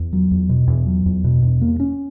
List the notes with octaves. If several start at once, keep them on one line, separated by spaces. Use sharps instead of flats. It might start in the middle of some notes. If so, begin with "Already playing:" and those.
Already playing: E2
F#3
E2
B2
E2
F#3
E2
B2
E2
A#3
C#4